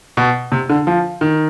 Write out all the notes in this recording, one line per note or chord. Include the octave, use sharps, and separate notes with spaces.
B2
C3
D3
F3
D#3